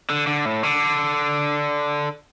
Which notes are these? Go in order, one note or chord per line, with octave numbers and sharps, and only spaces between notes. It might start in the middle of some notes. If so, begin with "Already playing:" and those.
D3
D3
A2
D3